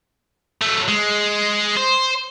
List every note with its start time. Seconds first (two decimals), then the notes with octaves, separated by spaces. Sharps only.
0.61 F#3 A3
0.88 G#3
1.77 C5